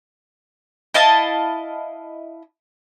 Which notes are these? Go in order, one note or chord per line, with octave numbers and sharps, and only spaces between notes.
E4 D#5 F5 A5